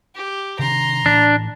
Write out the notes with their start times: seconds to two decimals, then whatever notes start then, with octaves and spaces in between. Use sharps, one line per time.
0.15 G4
0.59 C3 D#3 D4 A#5 C6
1.06 A2 E3 D4